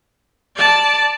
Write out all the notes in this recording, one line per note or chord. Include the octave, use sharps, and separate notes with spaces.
D5 A5